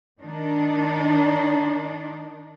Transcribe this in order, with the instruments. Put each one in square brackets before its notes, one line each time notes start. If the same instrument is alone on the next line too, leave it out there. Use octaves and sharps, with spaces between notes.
[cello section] D#3 D4 D#4